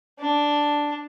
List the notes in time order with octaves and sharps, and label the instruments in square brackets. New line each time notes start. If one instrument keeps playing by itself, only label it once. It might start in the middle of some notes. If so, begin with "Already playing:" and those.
[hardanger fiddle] D4